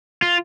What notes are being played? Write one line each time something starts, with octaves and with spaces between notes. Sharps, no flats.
F4